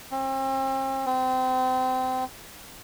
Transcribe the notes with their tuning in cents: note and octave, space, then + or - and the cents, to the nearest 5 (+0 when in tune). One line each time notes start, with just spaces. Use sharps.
C4 +40
C4 -25